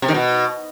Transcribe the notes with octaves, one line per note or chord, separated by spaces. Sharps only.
C3
D#3
B2